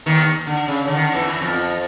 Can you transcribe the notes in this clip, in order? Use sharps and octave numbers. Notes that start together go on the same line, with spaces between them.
D#2 D#3
D3
C#3
D3
D#3
D3
E2 E3
F2 F3